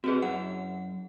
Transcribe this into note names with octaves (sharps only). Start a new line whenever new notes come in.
C4 F#4 G#4 B4 D#5
F#2 E4 F#5